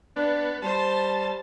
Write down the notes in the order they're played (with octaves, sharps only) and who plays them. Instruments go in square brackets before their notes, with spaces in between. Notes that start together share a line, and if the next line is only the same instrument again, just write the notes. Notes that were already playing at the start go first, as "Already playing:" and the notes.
[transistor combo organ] B3 [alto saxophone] D4
[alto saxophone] G3 [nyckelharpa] C5 [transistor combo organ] A5